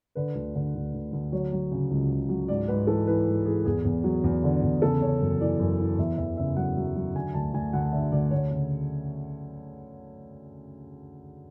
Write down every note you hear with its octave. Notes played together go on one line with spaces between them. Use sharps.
D3 B4
D2
D3
D2
D2
D2
F#3 C#5
F#3
C#3
C#2
C#2
F#3
G#2 D5
G#2 B4
E3 A4
E3 B4
G#2
E3 G#4
E2 G#4
E2
F#3
E2
D3
E2
C#3 A4
C#3 C#5
F#2
E3 D5
F#2
E3
E2 E5
E2 E5
C#3 E5
F#3 F#5
F#3
F#3
D3 G#5
D2 A5
D2 G#5
D2 F#5
D3 E5
D2 D5
D2 C#5
C#3